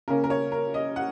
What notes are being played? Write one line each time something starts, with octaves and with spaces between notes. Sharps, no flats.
C#3 A#3 C#4 A#4
A#4
C#5
A#4
D#5
F#5